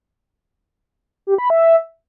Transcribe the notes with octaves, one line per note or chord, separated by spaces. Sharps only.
G4
B5
E5